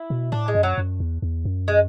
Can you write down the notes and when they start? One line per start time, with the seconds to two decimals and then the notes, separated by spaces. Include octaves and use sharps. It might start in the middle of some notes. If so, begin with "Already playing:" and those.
Already playing: E4
0.10 B2
0.32 A2 D4
0.48 G#3
0.55 F#2
0.63 F#3
0.78 F#2
1.00 E2
1.22 E2
1.45 F#2
1.68 G#3